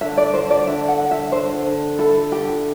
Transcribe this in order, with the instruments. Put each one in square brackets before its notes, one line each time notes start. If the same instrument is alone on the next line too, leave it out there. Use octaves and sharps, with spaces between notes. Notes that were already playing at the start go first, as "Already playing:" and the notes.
[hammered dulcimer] D3 [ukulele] E5
[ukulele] D5
[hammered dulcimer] D3 [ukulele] C5
[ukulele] D5
[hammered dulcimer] D3 [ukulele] E5
[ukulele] F#5
[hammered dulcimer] D3
[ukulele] E5
[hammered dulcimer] D3 [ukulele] C5
[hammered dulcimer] D3
[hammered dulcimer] E4 [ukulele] A4
[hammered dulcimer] D3 [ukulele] G4